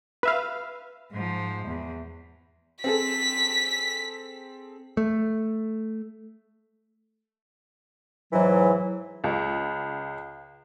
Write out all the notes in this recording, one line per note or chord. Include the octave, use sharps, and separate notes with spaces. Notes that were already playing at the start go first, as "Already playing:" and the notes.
B4 E5 F5
G#2 F3
E2
C4 G#4 A4 B6
A3
G#2 E3 F#3
C#2